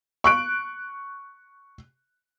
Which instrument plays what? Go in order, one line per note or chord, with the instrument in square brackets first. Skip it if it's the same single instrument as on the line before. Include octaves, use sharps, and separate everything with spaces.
[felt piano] C#6 F#6 D7